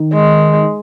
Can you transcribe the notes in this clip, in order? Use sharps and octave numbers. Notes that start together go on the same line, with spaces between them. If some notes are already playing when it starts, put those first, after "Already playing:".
Already playing: D#3
G#3